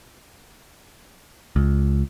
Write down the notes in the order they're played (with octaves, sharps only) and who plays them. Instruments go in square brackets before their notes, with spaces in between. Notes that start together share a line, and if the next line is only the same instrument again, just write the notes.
[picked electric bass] C#2